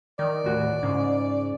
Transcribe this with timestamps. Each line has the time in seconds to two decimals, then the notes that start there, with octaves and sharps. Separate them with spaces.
0.19 D#3 D5
0.44 D#2 A2 F#4
0.83 G#2 C#3